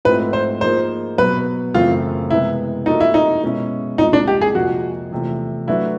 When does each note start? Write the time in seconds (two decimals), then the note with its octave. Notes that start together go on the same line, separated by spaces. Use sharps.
0.05 G#2 F3 A3 C4 E4 B4
0.33 C5
0.61 F3 A#3 D#4 G#4 C5
1.18 B2 F#3 B3 B4
1.74 F#2 C#3 E3 A3 C4 F4
2.30 C3 E3 G#3 B3 E4
2.86 F3 A#3 D4 D#4 F#4 A4
3.00 E4
3.14 D#4
3.43 B2 G#3 C#4 E4
3.98 C2 A#2 F3 G#3 D#4
4.13 D4
4.28 G4
4.41 G#4
4.55 F2 C3 F3 A#3 F#4
5.12 E2 C3 F3 A3
5.67 F#3 A3 D4 E4 F#4 B4